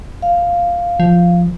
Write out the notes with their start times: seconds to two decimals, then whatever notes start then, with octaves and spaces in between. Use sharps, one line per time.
0.22 F5
1.00 F3